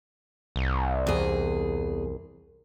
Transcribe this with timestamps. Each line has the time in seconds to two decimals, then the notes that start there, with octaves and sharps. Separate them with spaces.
0.56 C2
1.07 E2 G#4